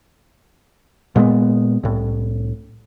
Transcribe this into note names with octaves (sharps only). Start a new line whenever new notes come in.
A#2 G#3 A#3 B3
C2 A2